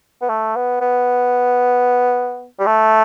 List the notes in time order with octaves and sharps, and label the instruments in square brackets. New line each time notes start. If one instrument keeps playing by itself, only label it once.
[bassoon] B3
A3
B3
B3
G3
A3